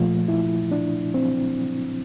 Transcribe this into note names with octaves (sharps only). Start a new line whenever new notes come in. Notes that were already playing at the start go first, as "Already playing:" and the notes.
Already playing: A#2 F3 A3 F4
E4
D4
C4